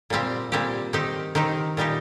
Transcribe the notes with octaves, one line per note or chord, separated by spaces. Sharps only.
A#2 G3 C4 G4
A#2 G3 C4 G4
D#3 C4 D#4 G4
D#3 C4 D#4 G4
A#2 G3 D#4 G4